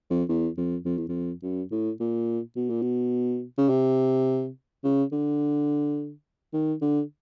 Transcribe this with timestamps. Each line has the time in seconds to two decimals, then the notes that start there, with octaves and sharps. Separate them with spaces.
0.10 F2
0.29 E2
0.57 F2
0.85 F2
0.98 E2
1.08 F2
1.43 F#2
1.71 A2
2.00 A#2
2.56 B2
2.70 A#2
2.82 B2
3.58 C#3
3.69 C3
4.84 C#3
5.12 D3
6.54 D#3
6.82 D3